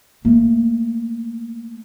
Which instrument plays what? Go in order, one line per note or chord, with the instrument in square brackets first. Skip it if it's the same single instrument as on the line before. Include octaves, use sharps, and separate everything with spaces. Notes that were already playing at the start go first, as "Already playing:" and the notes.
[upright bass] A3 A#3